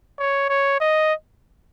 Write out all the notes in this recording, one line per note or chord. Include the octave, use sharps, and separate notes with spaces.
C#5
C#5
D#5